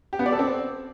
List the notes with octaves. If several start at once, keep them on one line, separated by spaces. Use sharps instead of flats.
G4
B3
D5
A4
C4